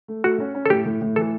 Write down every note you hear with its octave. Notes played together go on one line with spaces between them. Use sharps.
A3
A3 F#4
C#4
C#4
A4
A2 G4
A2
A2
E3 A4